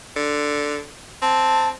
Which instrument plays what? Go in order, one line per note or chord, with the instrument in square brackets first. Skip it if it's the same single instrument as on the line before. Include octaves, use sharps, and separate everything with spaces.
[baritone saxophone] D3
[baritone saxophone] C4 [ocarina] A5